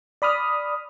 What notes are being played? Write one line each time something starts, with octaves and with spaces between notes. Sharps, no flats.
D5 B5 D#6 F6